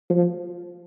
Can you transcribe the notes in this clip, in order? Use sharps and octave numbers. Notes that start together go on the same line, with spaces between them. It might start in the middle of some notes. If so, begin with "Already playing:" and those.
F3